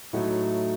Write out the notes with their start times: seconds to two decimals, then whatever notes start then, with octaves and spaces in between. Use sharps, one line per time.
0.13 A2 F#3 A3 D#4 F#4